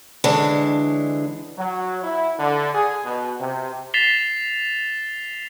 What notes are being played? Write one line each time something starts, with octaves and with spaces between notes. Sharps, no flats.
D3 E3 G#3 D4 C#5
F#3
E4
D3
G#4
B2
C3
A6 B6 C7 E7 F7 G7